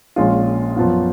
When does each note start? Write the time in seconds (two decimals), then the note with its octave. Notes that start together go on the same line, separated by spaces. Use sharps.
0.16 A#1 A#2 G#3 C#4 F4
0.76 F#2 F3 B3 F4